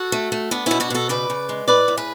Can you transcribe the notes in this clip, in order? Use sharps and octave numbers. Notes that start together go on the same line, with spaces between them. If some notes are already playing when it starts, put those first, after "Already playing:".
Already playing: F#4 A4
A3
A3
B3 D4
B2 C#4 E4
D4 F#4
B2 F#4 A4
C#3 B4 D5
C#3
G#3
A2 B4 D5
A2
G#4 B4